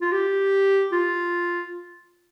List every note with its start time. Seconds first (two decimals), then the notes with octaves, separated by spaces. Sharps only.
0.01 F4
0.12 G4
0.92 F4